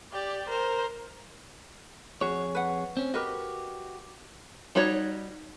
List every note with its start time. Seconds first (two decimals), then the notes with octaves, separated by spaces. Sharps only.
0.12 G4 D5
0.48 A#4 C5
2.21 F2 F#4 G#4 C#5
2.55 B4 F#5
2.97 C4 C#4
3.14 F#4 G4 A#4 B4 D#5
4.75 G3 D#4 F#4 C#5